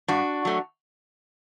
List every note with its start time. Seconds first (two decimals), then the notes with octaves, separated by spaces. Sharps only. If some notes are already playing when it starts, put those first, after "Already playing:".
0.08 G2 D4 F#4
0.45 F#3 A3